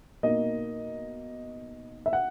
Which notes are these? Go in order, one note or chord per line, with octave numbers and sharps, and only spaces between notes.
B2 A#3 D#4 D#5
E5
F#5